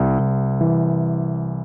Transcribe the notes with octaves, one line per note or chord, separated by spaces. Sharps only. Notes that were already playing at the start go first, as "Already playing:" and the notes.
Already playing: C2
C2
E3